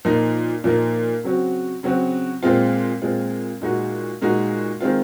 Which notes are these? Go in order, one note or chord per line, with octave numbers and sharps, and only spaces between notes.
A#2 F3 A#3 D#4
A#2 F3 A#3 D#4
C#3 F#3 C4 F#4
C#3 F#3 C4 F#4
A#2 G#3 C4 F4
A#2 G#3 C4 F4
A#2 G#3 D#4 F#4
A#2 G#3 D#4 F#4
D#3 G#3 C4 F4